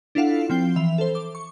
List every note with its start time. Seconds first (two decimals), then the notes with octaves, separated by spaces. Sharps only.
0.15 D4 E4 F4 A4 F5 F#5
0.50 F3 C4 G5 C7 G7
0.76 E3 E5 F7
0.98 A4 C5
1.15 D6
1.35 C#6